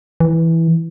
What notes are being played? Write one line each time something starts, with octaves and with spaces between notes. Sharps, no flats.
E3